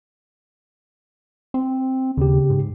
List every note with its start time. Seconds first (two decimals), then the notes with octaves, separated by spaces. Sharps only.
1.54 C4
2.17 D#2 C#3 G4
2.50 G#2